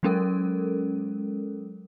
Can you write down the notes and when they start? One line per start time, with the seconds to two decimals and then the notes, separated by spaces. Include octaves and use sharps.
0.03 F#3 G#3 C#4 A4 A#4